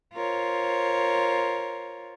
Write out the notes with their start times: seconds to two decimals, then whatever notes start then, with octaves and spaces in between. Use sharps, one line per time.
0.14 F4 A#4 C5 C#5